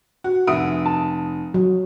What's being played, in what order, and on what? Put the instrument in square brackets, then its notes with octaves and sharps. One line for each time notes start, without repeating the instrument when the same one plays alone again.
[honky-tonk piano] F#4
[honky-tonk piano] F1 D#6 D7 [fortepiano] E5 F#5
[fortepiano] A5
[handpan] F#3